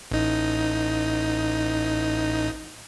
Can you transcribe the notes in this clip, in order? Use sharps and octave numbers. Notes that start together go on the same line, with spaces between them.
A1 D#4